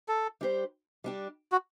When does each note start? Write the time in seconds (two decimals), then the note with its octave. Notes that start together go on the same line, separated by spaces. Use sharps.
0.08 A4
0.41 G3 D4 G4 C5
1.04 G3 D4 G4
1.52 F#4